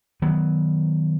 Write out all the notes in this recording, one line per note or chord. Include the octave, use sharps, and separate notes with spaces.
D#3 F#3 B3